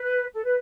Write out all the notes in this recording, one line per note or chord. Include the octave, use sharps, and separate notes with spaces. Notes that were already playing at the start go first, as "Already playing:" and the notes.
Already playing: B4
A4
B4